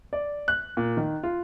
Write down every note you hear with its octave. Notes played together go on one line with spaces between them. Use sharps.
D5
F#6
A#2
D#3
F4